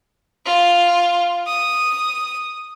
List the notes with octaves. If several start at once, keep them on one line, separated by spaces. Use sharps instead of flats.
F4
D#6